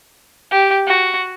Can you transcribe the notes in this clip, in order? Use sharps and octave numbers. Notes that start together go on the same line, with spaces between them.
G4
F#4